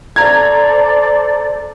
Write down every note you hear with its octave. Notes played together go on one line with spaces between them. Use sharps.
A4 C5 D5 A#5 G#6